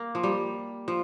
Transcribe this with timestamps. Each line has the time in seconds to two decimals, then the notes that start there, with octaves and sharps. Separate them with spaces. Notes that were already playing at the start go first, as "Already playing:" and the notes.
Already playing: A#3
0.15 F3
0.23 G3
0.88 F3